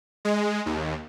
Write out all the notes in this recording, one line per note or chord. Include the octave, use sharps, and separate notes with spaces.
G#3
D#2